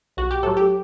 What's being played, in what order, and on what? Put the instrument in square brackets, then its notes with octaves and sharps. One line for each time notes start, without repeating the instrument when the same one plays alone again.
[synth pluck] B1 F#4
G4
A2 F#3 A4
G4